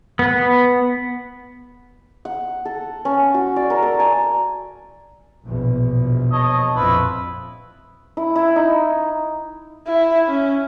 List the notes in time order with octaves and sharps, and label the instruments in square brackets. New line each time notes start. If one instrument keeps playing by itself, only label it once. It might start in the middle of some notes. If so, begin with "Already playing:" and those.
[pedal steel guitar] B3
[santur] F#5
A4
C#4
F#4
D5
A#4
A4
G#5
[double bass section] A#1 E2 B2
[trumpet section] C#5 D#5 A5
[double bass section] A#1 F2 [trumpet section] E4 F4 B4
[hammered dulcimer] E4
E4
D#4
[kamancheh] E4
C#4